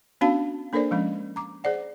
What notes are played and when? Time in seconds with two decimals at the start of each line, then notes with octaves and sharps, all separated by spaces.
0.21 B3 C#4 D4 F#4 F5 A5
0.73 A#3 D4 A4 A#4 C5 D5
0.91 F3 G#3 C#4
1.36 A#5 D6
1.64 G#4 C5 D5 F#5